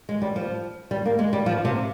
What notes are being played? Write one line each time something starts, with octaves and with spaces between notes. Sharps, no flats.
G#3
G3
F3
G3
A#3
G#3
G3
F3
C3